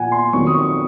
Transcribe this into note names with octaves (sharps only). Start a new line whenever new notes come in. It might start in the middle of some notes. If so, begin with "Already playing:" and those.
Already playing: A#2 F3 F#5 G#5
C6
F2 D#3 F#3 C#6
D#6
C#6